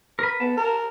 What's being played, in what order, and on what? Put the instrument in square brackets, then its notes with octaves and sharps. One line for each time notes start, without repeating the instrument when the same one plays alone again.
[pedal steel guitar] A#4 B4
[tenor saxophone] B3 [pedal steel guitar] A5
[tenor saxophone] A#4